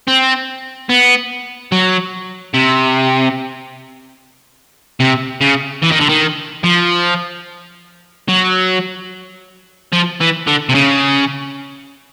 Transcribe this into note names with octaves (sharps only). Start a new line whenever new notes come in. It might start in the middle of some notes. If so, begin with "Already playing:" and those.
C4
B3
F#3
C3
C3
C#3
E3
D#3
D3
D#3
F3
F#3
F3
E3
D3
C3
C#3